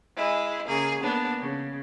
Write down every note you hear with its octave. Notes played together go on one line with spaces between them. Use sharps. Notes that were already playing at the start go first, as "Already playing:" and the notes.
G#3 E4
C#3 A#3 G#4
A#3 B3 D4
C#3